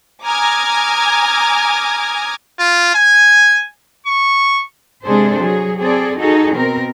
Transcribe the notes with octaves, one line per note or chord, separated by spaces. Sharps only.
G#5 A#5 D6 D#6 F6 G#6
F4
G#5
C#6
C3 G#3 D4 G#4 A4 C5
F#3 G#4
C4 G#4 A4 D5
D#4 F#4 G#4 A4
B2 C4 A#4